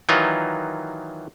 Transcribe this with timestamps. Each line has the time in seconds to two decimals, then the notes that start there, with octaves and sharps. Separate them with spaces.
0.09 D#3 E3 F#3 D#4 F4